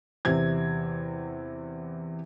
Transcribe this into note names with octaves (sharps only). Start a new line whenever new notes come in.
E2 C3 C4 G#6